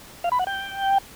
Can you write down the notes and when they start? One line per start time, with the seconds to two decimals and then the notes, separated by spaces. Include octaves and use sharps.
0.24 F5
0.32 B5
0.39 F#5
0.47 G5